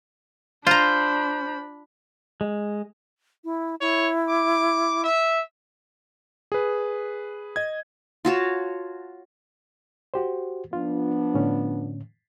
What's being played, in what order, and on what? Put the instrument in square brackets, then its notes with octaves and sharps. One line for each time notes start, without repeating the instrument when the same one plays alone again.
[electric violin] D4 B5 [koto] F4 A#5 [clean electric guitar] C5
[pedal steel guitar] G#3
[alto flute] E4
[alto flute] E4 [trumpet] C#5
[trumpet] D6
E5
[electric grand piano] G#4 B4
D#5 G#6
[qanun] F4 F#4 C#5 A5
[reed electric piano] F#4 G4 C5
[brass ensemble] F3 B3 D4 [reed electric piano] F4
[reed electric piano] A2 D3 C#4